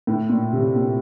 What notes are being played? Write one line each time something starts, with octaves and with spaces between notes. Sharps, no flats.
A2
A#2
C3
A#2